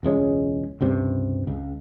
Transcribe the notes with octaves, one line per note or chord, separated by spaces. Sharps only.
E1 C#2 G#3 C#4
C#2 G2 C3
C#2